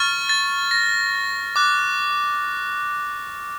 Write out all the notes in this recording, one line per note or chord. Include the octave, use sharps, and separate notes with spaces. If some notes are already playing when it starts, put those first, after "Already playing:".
Already playing: C#6 F6 A6
A6
A#6
D6 F#6